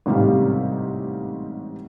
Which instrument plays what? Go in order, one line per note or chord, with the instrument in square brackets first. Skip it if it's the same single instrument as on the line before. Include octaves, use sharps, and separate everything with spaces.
[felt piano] A1 G#2 C3 G3 G4 F5